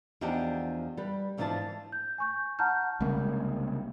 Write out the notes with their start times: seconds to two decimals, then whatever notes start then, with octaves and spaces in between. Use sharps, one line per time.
0.21 E2 F3 D4 D#4 G4 F#5
0.97 G3 B4
1.38 G#2 E3 F3 D4 C5 A5
1.92 G6
2.18 G#5 C#6 G6
2.59 F#5 A5 A#5 F6 G6
3.01 C2 C#3 G#3 A#3